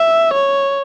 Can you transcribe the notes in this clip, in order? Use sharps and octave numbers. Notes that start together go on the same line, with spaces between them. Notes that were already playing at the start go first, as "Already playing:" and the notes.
Already playing: E5
C#5